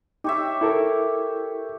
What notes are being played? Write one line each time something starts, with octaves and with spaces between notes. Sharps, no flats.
D#4 G4 C#5 E5
E4 A4 A#4